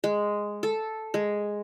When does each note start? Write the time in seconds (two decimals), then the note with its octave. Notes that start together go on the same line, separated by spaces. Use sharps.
0.04 G#3
0.63 A4
1.14 G#3